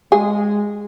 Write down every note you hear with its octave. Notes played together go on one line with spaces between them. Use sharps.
G#3 G#4